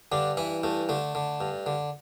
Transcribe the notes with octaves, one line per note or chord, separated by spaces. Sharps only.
G2 D3 D4
E3 E4
G2 A3
D3 A3
D3
G2
D3